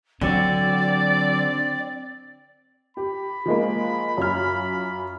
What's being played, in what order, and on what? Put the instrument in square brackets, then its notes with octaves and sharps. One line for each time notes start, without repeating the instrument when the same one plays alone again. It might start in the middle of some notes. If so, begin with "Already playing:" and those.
[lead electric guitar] D3 F#4 [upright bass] F#3 [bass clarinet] C4 [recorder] D5
[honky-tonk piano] G4 [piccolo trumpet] B5
[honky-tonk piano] F3 G#3 A#3
F#2 F4 F6